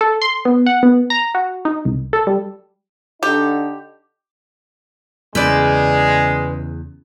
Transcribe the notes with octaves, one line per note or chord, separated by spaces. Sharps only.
A4
C6
B3
F#5
B3
A#5
F#4
D#4
C2
A4
G3
D3 D#4 G4
E2 C#3 G#3 B4 D5